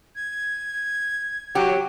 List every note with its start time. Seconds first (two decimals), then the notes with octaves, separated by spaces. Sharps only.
0.16 G#6
1.55 F#3 G4